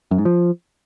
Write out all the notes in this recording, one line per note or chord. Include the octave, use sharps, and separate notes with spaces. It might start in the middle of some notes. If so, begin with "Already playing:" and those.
F#2
G#2
F3